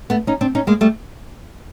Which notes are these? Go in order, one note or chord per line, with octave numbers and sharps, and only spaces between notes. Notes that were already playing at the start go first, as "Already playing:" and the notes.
A3 B3
C#4 D#4
C4 D4
C#4 D#4
G#3 A#3
G3 A3